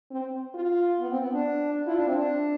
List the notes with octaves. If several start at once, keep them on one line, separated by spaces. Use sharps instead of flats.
C4
F4
B3
C4
B3
D4
E4 F4
D4
C4
D4